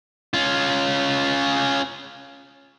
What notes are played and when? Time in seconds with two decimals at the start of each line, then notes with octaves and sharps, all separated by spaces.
0.34 C#4 F4